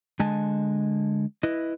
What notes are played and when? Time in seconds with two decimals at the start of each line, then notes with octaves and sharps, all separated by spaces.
0.20 D3 G#3 D#5 G#5 A5
1.43 E4 B4 D#5